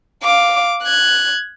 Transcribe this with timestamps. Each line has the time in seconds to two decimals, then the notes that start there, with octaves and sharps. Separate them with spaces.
0.23 F5 D6
0.83 F#6 G#6